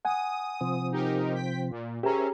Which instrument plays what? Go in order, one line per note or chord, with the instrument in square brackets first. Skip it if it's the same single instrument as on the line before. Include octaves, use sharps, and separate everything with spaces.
[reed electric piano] F#5 G#5 [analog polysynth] D#6
[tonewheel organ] C3 F3 C4
[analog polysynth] D#4 G4 A#4
G5 B6
A#2
[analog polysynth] C#4 [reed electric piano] G4 G#4 A#5 [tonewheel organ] A#4 C5 E5